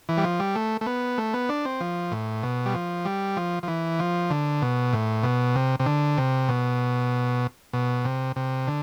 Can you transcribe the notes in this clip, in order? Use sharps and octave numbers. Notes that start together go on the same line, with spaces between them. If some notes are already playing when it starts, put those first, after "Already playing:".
E3
G3
F3
G3
A3
A3
B3
A3
B3
D4
C4
F3
A2
B2
G3
F3
G3
F3
F3
E3
F3
D3
B2
A2
B2
C3
C3
D3
C3
B2
B2
C3
C3
D3